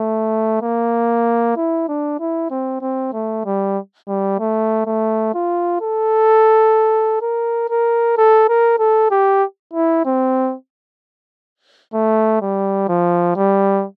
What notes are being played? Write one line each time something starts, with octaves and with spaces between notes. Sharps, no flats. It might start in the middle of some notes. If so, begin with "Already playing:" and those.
Already playing: A3
A#3
E4
D4
E4
C4
C4
A3
G3
G3
A3
A3
F4
A4
A#4
A#4
A4
A#4
A4
G4
E4
C4
A3
G3
F3
G3